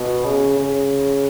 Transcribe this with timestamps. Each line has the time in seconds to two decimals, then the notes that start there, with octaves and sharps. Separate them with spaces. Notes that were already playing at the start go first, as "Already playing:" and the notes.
Already playing: B2
0.24 C#3
0.58 C#3